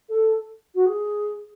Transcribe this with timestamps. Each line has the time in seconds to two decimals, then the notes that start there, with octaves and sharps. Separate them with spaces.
0.09 A4
0.75 F#4
0.86 G#4